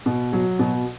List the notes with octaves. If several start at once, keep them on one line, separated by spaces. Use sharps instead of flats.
B2
F#3
B2